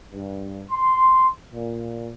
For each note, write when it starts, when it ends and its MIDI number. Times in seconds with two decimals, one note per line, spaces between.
0.12 0.63 43
0.71 1.28 84
1.53 2.13 46